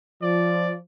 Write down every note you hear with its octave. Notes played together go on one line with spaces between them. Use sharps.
F3 D5